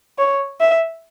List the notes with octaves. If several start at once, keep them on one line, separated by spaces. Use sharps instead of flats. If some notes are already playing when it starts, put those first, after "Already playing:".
C#5
E5